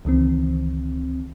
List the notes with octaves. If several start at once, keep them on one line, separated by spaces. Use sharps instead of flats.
C#2 D#3 E3 C4